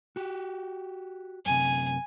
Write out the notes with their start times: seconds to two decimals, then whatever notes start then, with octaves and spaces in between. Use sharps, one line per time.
0.16 F#4 G4
1.46 F#2 C3 G#5